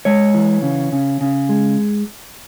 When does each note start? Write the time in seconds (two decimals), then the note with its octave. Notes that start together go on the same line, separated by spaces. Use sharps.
0.05 G#3 C#5
0.34 E3
0.62 C#3
0.92 C#3
1.21 C#3
1.49 G#3